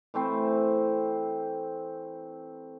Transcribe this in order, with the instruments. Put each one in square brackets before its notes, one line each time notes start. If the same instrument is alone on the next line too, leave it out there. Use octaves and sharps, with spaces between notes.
[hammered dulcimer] E3 A3 C4 C5